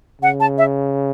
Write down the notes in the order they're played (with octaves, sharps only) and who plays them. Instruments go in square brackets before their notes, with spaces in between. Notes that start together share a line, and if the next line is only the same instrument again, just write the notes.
[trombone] C#3 [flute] F#5
[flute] A5
E5